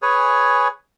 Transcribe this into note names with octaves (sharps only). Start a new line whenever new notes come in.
G#4 B4 C#5 G#5